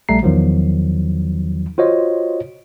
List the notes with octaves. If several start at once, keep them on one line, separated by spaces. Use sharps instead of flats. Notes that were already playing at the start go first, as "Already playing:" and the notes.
A#1 G3 A3 A#5 C7
E2 D#3 F3 F#3
F4 F#4 C5 C#5 D#5